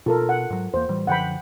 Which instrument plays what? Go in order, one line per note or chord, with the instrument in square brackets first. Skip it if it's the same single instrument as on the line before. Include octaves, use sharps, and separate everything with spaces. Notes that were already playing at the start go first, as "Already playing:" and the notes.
[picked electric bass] B2 [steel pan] F4 A4 A#4
[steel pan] F#5
[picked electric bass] G#2 F#3
[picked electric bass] E2 A#3 [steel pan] C5
[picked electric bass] A2 E3 G3
[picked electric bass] F#2 D3 F3 [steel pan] F#5 G5 B5